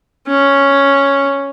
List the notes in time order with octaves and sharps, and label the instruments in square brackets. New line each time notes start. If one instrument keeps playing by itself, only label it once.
[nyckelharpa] C#4